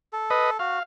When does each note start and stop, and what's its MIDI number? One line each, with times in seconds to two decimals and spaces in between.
0.13 0.57 69
0.30 0.50 71
0.30 0.50 75
0.59 0.79 66
0.59 0.83 77